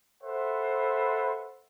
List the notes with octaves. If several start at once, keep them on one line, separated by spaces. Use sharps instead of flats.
A4 B4 C5 E5 F#5